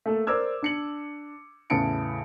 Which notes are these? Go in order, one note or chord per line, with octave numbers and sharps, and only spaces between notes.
A3 A#3 A4
A#4 C5 D5 D6 E6 G#6
D4 C#7 F#7
E2 A2 C#3 A5 C#7 D7